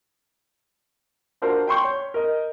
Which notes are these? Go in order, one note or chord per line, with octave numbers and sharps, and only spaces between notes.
D4 F4 F#4 A#4 C5
G5 C6 C#6 G6
C#5
A#4 D#5